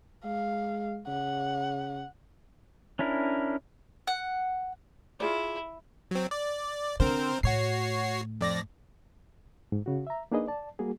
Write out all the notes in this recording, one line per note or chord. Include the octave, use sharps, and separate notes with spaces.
G#3 F5
C#3 F#5
C#4 D4 E4 A#4
F#5
E4 F4 G#4 D5
F#3 C4
D5
D3 C4 A#4 C5
A2 F#4 C#5 C7
F2 D5 A#6
G#2
C#3 F#4
E5 A#5
A#3 D4 D#4 G#4 B4 D#5
D5 A5
G3 A#3 F#4 G#4